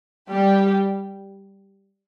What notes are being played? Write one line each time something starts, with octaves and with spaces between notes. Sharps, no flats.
G3 G4